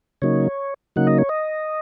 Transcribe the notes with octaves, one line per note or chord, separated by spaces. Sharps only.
C#3 F#3 A#3 D#4 C#5
C#3 F#3 A#3 D#4 F#5
D#5
C#5
D#5